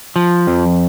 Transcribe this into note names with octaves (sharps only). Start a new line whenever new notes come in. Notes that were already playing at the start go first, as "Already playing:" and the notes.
F3
F2